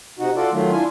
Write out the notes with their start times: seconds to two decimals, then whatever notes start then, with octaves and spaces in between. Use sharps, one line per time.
0.19 C3 D#4 F#4
0.36 F4 F#4 A4 D5
0.52 D#3 F#3 A3 F4
0.72 D4 E4 F4 G#5